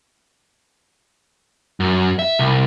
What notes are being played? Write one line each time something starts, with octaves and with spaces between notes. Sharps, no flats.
F#2
E5
C2